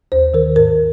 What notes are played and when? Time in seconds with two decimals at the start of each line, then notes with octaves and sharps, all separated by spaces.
0.12 D#2 C5
0.34 D#3 A#4
0.56 G#2 A#4